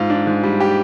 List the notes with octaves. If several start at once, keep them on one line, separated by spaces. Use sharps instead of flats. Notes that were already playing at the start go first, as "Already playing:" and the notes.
Already playing: G#2 F4
D4
G#2
G3
G4